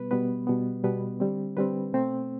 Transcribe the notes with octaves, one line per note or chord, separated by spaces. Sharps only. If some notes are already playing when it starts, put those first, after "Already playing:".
Already playing: B2 G3 B3 B4
B2 G3 B3 B4
B2 G3 B3
B2 G3 B3 B4
D3 G3 C4
D3 G3 C4 B4
B2 A3 C4